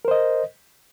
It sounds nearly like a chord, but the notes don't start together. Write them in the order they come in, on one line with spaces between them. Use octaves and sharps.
A#4 C5 D#5